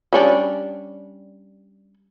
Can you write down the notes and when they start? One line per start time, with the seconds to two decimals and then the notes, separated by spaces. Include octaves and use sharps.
0.13 G3 C#4 D4